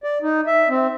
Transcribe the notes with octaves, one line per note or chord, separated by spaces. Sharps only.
D5
D#4
E5
C4